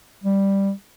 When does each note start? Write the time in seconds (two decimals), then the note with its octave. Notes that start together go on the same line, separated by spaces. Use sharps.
0.24 G3